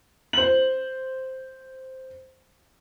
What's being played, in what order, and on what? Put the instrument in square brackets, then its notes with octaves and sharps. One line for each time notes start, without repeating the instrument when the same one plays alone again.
[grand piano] C5 F#7